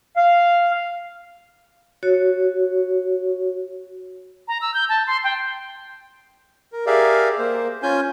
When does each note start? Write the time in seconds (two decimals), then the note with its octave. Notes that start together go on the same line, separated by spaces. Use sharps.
0.17 F5
2.03 F#4 C#5
4.48 A#5
4.61 E6
4.74 G6
4.89 A5
5.07 C6
5.24 G5
6.72 A#4
6.86 G4 G#4 A#4 D5 E5 F5
7.39 A#3 C5
7.83 C#4 F4 G#5 G6